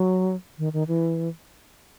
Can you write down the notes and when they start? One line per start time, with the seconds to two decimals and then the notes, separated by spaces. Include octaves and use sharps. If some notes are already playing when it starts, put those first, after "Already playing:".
Already playing: F#3
0.58 D#3
0.73 D#3
0.88 E3